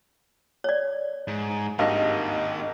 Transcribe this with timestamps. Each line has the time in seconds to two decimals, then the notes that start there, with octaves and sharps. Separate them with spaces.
0.64 C#5 D5
1.28 G#2
1.79 G#1 G2 A#3 D#4 D#5 F5